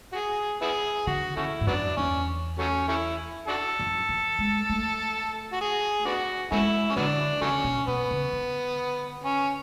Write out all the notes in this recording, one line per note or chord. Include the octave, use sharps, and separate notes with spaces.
F#4
G#4
B3 E4 G#4
D3 F#4
D3 A3 C#4 E4
G#2
F#2 F#3 B3 D4
E2 C#4
F#3 A3 C#4
A3 C#4 E4
D4 F#4 A4
F#2
E3
G#3
A3
F#4
G#4
B3 D4 F#4
G#3 A3 C#4 E4
C#4
D3 F#3 B3 D4
C#3 F#3 A3 C#4
B2
B2 B3
C#3
D3
C#4